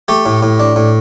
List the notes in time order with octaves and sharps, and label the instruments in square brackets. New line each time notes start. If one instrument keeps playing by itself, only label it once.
[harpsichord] A3 G4
A2
A2
D4
A2